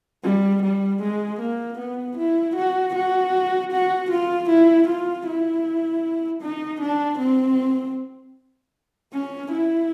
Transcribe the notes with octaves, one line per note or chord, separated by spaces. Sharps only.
G3
G3
G#3
A#3
B3
E4
F#4
F#4
F#4
F4
E4
F4
E4
D#4
D4
C4
C#4
E4